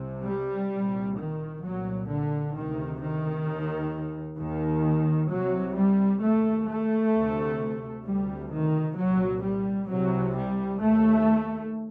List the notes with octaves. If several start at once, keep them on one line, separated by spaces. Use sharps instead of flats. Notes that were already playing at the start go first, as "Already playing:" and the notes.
Already playing: C2 C3
G3
C2 A#2
D#3
C2 A#2 F#3
D3
D2 C3 D#3
D#3
D#2
D#2 D#3
C2 C3 F#3
G3
D#2 A3
A3
D2 C3
D2 C3 G3
D#3
C2 A#2 F#3
G3
C2 C3 F#3
G3
D#2 A3